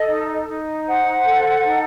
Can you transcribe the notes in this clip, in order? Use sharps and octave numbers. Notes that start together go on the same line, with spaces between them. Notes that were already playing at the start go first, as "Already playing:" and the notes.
Already playing: A4 D#5
D#4
D#4
C5 F#5
A4
D#4